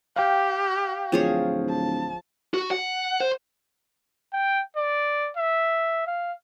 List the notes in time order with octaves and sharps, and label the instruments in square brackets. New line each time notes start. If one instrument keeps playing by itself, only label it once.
[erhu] G4 [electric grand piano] F5 G5
[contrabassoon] D1 [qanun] F3 G#4 C#5
[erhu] A5
[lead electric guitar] F#4
F#5
C5
[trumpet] G5
D5
E5
F5